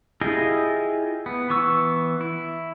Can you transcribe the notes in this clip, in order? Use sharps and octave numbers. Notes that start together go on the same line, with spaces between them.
E4 F4 G4 G#4 D#5
B3
E3 B3 C#6 E6
E4